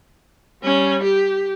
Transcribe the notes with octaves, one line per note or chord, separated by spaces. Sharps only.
G3 C#4
G4